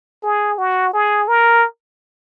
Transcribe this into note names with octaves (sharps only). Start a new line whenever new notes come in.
G#4
F#4
G#4
A#4